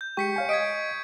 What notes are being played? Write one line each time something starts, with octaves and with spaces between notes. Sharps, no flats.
G6
G#3 G4 G5 C#6 B6 C#7
C#5 F5 G#5
D#5 D#6 G#6 B6 D7